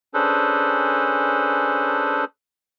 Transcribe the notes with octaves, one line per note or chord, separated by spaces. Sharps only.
C#4 D4 G#4 A4 B4 C5